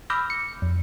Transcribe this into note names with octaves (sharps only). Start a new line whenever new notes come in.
B5 D6 E6 F6 G6 A#6
C#7
F2